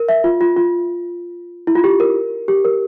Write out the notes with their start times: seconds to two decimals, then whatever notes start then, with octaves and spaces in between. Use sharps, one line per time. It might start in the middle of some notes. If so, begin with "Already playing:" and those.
Already playing: A#4
0.09 E5
0.24 F4
0.41 F4
0.57 F4
1.67 E4
1.75 F4
1.84 G4
2.00 A#4
2.48 G4
2.65 A#4